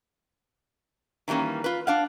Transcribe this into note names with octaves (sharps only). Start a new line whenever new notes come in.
D#3 E3 G3 A#3 C#4
F4 B4
D4 F5 F#5